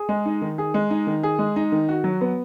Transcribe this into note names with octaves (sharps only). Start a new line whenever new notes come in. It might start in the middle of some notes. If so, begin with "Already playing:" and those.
Already playing: G#4
G#3
D#4
D#3
G#4
G#3
D#4
D#3
G#4
G#3
D#4
D#3
F#4
F#3
B3